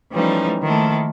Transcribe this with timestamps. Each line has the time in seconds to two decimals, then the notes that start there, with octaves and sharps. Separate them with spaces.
0.12 E3 F3 G3 A3 C#4 D#4
0.63 D#3 F3 A3 A#3 E4 A4